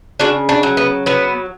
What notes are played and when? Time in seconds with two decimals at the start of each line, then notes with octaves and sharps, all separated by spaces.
0.20 C#3 D4 F#4
0.49 D4 F#4
0.63 F#3
0.77 B3
1.06 F#3 B3